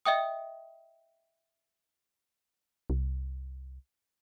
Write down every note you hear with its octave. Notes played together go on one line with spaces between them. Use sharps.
D#5 E5 G5 D#6
C2